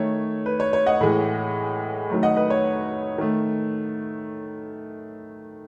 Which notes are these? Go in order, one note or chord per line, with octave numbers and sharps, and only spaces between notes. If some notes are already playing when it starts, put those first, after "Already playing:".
Already playing: D#3 A3 C#5
B4
C#5
C#5
D#5 F#5
A2 E3 G#3
D#3 F#3 A3
D#5 F#5
B4 D#5
C#5
D#3 A3